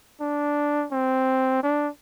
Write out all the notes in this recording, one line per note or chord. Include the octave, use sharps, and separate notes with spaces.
D4
C4
D4